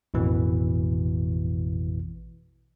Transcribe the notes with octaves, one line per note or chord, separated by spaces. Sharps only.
A1 F2 B2 E3